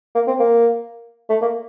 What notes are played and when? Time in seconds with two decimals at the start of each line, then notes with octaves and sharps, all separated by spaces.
0.15 A#3
0.28 C4
0.40 A#3
1.30 A3
1.42 A#3